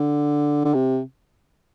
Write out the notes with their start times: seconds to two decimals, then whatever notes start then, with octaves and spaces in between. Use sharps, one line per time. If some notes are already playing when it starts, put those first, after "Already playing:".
Already playing: D3
0.64 D3
0.74 C3